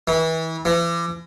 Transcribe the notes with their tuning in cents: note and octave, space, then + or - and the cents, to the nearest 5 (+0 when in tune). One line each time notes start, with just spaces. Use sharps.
E3 -30
E3 +40